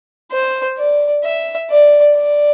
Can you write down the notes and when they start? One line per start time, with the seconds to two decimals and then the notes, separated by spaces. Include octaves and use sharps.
0.32 C5
0.78 D5
1.24 E5
1.70 D5
2.16 D5